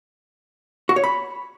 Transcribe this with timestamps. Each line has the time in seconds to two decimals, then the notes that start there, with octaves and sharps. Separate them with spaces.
0.89 F#4
0.96 C#5
1.04 B5